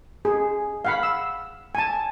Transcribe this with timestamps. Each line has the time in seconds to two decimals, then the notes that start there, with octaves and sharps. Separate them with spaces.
0.25 G#4
0.85 F5 F#5 B5
1.03 E6
1.75 G#5 A5